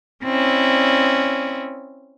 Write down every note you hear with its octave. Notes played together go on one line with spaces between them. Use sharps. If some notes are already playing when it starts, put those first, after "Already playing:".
C4 C#4 E4 D5